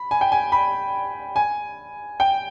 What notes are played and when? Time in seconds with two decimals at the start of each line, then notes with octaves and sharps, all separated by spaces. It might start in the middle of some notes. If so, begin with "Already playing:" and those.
Already playing: B5
0.11 G#5
0.21 G5
0.32 G#5
0.52 B5
1.36 G#5
2.20 G5